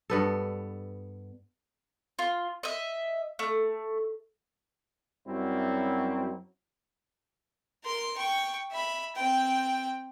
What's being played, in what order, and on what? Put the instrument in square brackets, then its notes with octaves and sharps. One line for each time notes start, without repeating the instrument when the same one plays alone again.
[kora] G2 B3 A4
[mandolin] F4
D#5 E5
A3
[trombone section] F#2 F#3 G3 C4 C#4 E4
[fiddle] A#4 C6
G5 C#6
E5 B5
C4 G5